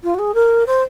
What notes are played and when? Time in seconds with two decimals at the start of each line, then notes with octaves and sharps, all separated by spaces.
0.03 F4
0.14 F#4
0.19 G#4
0.34 A#4
0.66 C5